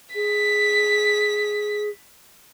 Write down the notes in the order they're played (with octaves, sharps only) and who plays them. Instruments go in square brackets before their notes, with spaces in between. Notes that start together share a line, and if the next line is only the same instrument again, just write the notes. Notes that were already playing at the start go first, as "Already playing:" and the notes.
[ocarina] G#4 [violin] B6